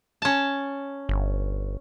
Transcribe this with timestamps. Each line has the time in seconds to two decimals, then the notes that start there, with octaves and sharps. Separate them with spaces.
0.22 C#4 A5
1.09 G1